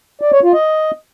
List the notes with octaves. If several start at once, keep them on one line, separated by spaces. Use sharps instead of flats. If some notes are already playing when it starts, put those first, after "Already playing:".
D5
C#5
F4
D#5